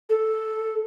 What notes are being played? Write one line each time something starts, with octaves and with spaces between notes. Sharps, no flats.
A4